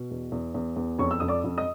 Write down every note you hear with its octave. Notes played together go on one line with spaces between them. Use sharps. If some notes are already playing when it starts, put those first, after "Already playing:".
Already playing: B2
E2
E2
E2
E2
F2 C#5 C#6
E6
F2 D#6
D5 D6
F2
D#5 D#6